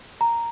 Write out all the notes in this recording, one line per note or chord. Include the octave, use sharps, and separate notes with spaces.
A#5